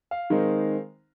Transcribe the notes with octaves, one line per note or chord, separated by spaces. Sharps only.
F5
D#3 G#3 C4 D#4